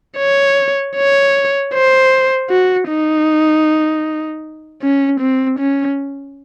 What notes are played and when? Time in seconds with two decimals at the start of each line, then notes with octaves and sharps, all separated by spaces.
0.18 C#5
0.96 C#5
1.74 C5
2.50 F#4
2.89 D#4
4.82 C#4
5.20 C4
5.59 C#4